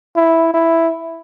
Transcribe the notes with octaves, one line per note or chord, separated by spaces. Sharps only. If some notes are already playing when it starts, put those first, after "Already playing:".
E4
E4